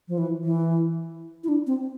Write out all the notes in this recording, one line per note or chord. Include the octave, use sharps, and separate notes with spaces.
F3
E3
E3
E4
D4
C4